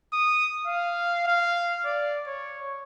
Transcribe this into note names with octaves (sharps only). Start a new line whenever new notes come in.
D#6
F5
F5
D5
C#5